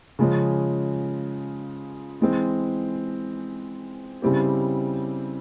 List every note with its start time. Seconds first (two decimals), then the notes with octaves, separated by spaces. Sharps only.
0.19 C#3 F3 G#3 C#4
2.21 E3 G#3 C4
4.22 C#3 G3 C4 E4 G4